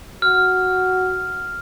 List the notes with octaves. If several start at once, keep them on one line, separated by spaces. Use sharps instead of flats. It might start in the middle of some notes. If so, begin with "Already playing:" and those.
F#4 F6